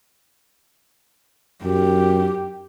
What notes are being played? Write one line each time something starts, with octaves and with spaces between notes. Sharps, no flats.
F#2 G4